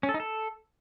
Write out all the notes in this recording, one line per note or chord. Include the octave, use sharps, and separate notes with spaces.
C#4
A4
D#4
A4